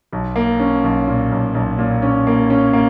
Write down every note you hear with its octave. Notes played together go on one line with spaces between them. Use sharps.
B1
A#3
C#4
B1
A#2
B1
B1
A#2
C#4
A#3
C#4
A#3